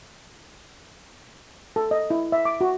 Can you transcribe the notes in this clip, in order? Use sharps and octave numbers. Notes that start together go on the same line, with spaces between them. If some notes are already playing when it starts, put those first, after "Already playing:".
A4
D#5
E4
E5
D6
F#4